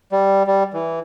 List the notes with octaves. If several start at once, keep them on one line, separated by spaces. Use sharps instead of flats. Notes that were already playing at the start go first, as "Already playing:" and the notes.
G3
G3
E3